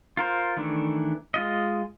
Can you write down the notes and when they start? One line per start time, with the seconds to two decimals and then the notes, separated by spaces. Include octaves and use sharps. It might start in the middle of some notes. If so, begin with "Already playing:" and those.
0.17 F4 A#4 C5
0.57 D#3 E3 A3 D4
1.34 G#3 F4 D#5